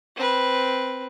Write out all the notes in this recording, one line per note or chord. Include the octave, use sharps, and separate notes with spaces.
C4 B4